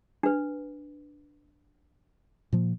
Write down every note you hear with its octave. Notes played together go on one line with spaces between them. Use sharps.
D4 B4
A#2 F3 A#3